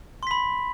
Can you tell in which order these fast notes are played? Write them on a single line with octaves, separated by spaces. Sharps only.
C6 B6 B5